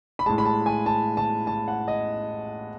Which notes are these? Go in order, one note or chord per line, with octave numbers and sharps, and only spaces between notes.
B5
A2 G#3 A5
B5
A5
G#5
A5
A5
A5
F#5
D#5